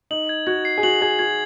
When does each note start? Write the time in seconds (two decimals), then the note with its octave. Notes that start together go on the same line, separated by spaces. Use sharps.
0.11 D#4 F#7
0.29 G#6
0.47 F#4 G#6
0.65 C7
0.78 G#4
0.83 F#4 F#7
1.02 G#4 G#6
1.19 F#4 G#6